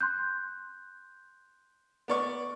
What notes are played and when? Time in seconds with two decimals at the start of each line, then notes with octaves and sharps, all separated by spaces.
0.01 C6 F#6 G6
2.08 B3 D5 C#6